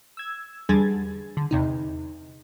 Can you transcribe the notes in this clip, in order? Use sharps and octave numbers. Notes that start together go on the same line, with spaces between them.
E6 G#6
E2 D3 G3 G#4 G#6 A6
D3
E2 C3 D#4